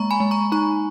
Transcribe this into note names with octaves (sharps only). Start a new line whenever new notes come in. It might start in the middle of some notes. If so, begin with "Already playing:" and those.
Already playing: G#3 A#3 A#5 C#6
G#5 B5
G#3
A#5 C#6
D#4 A#5 C#6